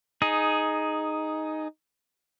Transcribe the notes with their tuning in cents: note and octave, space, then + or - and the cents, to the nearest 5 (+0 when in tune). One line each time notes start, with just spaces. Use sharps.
D#4 +0 G#4 +10